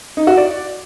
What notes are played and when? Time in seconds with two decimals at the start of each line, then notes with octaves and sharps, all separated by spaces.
0.17 D#4
0.27 F#4
0.37 D5